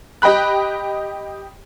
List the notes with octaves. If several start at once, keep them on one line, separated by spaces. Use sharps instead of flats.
G4 D#5 G5 B5 F#6